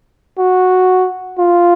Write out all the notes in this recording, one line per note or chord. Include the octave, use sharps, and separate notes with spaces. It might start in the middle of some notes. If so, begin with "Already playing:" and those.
F#4
F4